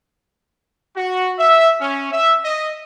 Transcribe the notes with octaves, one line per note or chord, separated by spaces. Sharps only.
F#4
E5
C#4
E5
D#5